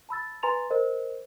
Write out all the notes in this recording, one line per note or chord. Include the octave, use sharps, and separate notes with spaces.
A5 B5 E6 A6
B4 G#5 A#5 C6 A6 F7
A#4 C5 D#5